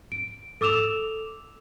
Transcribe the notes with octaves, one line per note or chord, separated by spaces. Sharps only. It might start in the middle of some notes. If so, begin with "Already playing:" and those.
D7
A4 D6 E6 E7 F7